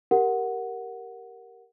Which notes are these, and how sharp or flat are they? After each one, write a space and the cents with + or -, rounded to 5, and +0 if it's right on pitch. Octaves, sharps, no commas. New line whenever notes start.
G4 +0 A#4 +0 F#5 +0